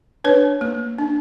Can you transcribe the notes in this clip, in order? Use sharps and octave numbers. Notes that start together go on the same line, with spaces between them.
D4 B4 C#5
A#3
D4